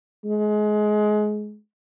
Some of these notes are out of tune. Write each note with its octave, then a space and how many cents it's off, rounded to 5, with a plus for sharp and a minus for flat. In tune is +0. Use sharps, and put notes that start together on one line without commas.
G#3 +25